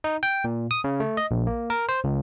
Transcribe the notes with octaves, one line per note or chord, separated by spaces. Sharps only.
D#4
G5
A#2
D#6
C#3
A3
D#5
A#1
A#3
A#4
C5
C#2